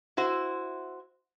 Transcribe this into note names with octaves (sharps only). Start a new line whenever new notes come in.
E4 F#4 C5